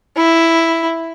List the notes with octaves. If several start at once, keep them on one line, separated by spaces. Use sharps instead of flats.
E4